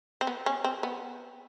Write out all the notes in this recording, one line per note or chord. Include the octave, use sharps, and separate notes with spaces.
C4
B3
C#4
C4
B3